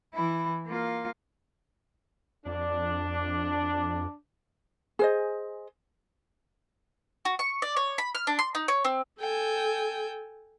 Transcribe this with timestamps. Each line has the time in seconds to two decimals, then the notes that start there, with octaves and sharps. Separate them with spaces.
0.14 E3 E4
0.67 A#3 F4
2.46 F2 D4
4.99 G#4 C5 D#5
7.25 F#4
7.39 C#6
7.62 D5
7.76 C#5
7.98 B5
8.15 F6
8.27 D4
8.39 C6
8.55 D#4
8.68 C#5
8.84 C4
9.20 A4 G5 G#5